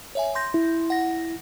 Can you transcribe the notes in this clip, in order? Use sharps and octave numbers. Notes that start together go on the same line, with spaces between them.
C#5 E5 G#5
C6 G6 A#6
E4
F#5 A#6